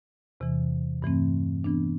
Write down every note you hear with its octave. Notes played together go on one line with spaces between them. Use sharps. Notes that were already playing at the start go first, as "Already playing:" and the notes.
E2 C3 E3
G2 E3 A3 C4
E3 B3 D4